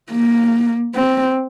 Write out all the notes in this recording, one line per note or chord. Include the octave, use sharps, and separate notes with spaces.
A#3
C4